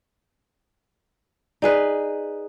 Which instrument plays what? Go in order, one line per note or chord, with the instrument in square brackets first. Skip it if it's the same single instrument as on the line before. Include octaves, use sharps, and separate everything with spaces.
[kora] D#4 G#4 B4 [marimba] D5